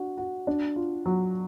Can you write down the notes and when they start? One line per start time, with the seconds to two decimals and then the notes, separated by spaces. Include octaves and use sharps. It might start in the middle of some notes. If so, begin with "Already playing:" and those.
Already playing: D4 F#4
0.17 F#4
0.47 D4
0.76 F4
1.06 F#3